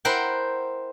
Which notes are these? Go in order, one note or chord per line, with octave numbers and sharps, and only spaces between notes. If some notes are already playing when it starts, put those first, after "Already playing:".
E4 A#4 C5 F#5 G5